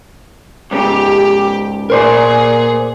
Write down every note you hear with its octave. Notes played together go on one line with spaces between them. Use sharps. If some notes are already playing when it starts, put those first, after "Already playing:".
C#2 G#2 C#3 G4
A#2 G#4 A#4 C5 D5